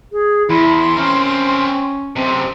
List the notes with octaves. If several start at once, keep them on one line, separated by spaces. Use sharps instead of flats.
G#4
E2 E4 C6
C4 C#4 A#4
F#2 C3 C4